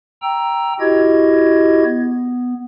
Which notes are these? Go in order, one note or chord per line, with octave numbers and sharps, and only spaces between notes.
G5 A#5 E6
E4 F#4 G4 D#5 G#6
B3